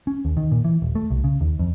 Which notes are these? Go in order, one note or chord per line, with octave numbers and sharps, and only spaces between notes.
C#4
D#2
D#3
A#2
E3
D#1
A3
C2
C#3
D#2
F2